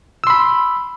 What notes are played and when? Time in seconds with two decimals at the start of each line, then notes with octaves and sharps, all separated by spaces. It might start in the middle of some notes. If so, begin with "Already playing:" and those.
0.24 E6
0.27 C6
0.30 B5